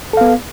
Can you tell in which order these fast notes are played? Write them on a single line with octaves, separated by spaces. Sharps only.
A4 F5 B3